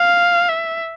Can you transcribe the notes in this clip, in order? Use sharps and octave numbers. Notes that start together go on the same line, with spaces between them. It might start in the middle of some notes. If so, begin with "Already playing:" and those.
Already playing: F5
E5